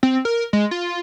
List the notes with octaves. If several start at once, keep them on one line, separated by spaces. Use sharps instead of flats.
C4
A#4
G#3
F4